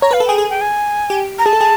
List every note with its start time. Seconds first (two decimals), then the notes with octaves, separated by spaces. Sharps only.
0.02 C#5 A#5
0.11 B4 F5
0.20 A4
0.26 G#4 G5
0.37 G#4 G#5
0.50 G5
0.61 G#5
1.10 G4
1.39 A#5
1.46 G#4 A5
1.53 A4
1.61 G#4